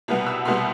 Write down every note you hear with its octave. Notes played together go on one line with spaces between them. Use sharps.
C2 B2 G3 B3
E6
C2 B2 G3 B3 C6